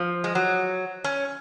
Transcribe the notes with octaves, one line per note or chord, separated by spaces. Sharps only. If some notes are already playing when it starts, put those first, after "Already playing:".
Already playing: F3
G#3
F#3
C#4